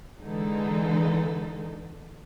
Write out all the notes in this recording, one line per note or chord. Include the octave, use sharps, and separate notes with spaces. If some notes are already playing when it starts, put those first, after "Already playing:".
D3 E3 G#3 D#4 A4